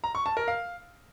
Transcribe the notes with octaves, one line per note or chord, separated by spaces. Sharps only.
A#5
C#6
A5
A#4
F5